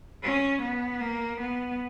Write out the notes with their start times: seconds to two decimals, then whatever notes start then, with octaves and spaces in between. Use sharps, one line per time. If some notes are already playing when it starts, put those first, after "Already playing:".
0.23 C#4
0.62 B3
1.00 A#3
1.40 B3